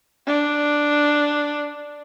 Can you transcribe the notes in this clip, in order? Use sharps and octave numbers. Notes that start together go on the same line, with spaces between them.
D4